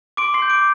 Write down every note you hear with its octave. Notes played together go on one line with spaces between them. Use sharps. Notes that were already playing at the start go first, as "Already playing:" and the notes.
C6 D6 D7
C6 C7
G6
D6 D7